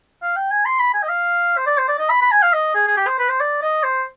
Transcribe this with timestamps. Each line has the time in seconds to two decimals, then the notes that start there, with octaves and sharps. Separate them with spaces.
0.22 F5
0.36 G5
0.51 G#5
0.65 C6
0.80 B5
0.94 G#5
1.02 D#5
1.09 F5
1.57 C5
1.67 D5
1.78 C5
1.88 D5
1.99 D#5
2.10 B5
2.21 B5
2.31 G#5
2.42 F5
2.53 D#5
2.75 G#4
2.87 G#4
2.97 G4
3.07 C5
3.19 B4
3.29 C5
3.40 D5
3.62 D#5
3.83 C5